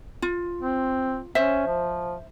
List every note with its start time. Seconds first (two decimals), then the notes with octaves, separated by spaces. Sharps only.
0.22 F4
0.61 C4
1.35 C#4 C5 E5
1.67 F3